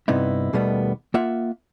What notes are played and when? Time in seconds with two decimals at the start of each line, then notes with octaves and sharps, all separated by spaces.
0.08 G2 C3 B3 D#4 E4
0.53 D#2 B2 D#3 G3 A3 B3
1.14 A#3 F4 E5 F#5